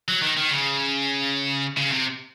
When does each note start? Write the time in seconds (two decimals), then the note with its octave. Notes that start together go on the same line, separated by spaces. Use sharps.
0.08 F#3
0.22 D#3
0.37 D#3
0.51 C#3
1.78 C#3
1.92 C3